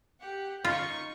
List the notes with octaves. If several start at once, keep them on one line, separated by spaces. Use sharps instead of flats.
G4 F#5
D#4 F4 C#6